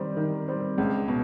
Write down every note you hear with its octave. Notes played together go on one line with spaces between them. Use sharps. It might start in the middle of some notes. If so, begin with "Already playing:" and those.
Already playing: D#3 G3 C4
D#3
G3 C4
C#2
B2